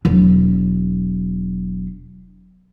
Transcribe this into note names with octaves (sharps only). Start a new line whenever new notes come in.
E1 F#3